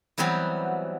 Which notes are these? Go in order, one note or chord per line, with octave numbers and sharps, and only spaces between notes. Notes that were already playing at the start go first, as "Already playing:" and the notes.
E3 F#3 G3 B3 C4 F#4